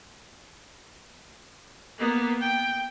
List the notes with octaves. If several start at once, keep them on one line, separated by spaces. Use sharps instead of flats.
A#3 B3
G5